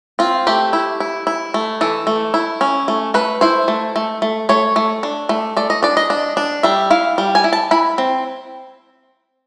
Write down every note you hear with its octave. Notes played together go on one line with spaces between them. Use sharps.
C4 F4
A3 G4
E4
E4
E4
A3
E3 A4
A3
E4
C#4
A3
A3 B4
E4 C5
A3
A3
A3
A3 C#5
A3
D4
A3
A3 D5
D#5
D4 D5
D#5
D4
D4
G3 E5
E4 F5
G3
G#5
E4
A5
E4 B5
C4